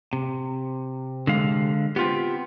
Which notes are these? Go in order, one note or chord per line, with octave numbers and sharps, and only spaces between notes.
C3
D3 G#3 F5
B3 C4 F4 G4